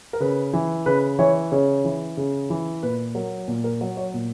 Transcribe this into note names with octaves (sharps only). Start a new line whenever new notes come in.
A#4
C#3 B4
E3
C#3 B4
E3 C#5
C#3 C#5
E3
C#3
E3
A#2 B4
F#3 A#4
A#2
A#4
F#3 C#5
C#5
A#2